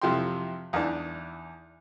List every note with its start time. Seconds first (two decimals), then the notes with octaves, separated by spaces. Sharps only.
0.01 F2 C3 F3 E4 G5 C6
0.73 E2 E3 D4 D#4